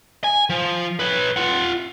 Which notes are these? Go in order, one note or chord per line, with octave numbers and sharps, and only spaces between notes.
G#5
F3
B4 C#5
F4 F#5